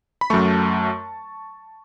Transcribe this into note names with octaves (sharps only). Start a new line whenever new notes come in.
B5
F#2 F#3 A3 A5 C#6